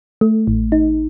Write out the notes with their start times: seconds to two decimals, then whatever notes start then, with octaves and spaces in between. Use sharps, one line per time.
0.21 A3
0.47 A1
0.72 D#4